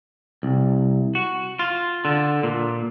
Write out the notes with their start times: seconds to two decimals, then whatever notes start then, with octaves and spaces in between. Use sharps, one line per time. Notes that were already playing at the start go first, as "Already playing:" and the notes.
0.43 C2
1.15 F#4
1.59 F4
2.05 D3
2.43 A#2